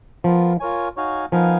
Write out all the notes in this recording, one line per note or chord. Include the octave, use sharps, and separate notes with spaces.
F3 B3 F4 A#4
F4 A#4 C#5 G#5
D#4 F#4 C#5 F5 G#5
F3 B3 D#4 A#4 F5 G#5